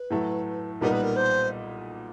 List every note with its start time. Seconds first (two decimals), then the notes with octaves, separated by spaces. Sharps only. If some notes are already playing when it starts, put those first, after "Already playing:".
Already playing: B4
0.10 A2 F#3 A3
0.81 B1 A#2 G3 B3 D#4 A#4
0.92 B4
1.03 A#4
1.16 C5